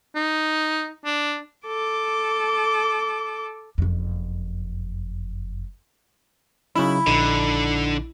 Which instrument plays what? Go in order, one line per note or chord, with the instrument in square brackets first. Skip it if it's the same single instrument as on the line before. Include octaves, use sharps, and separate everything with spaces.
[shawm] D#4
D4
[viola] A4 D6
[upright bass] F#1 F2
[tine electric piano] C#3 F#3 D#4 [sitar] E4
[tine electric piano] A#1 D#4 [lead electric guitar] D3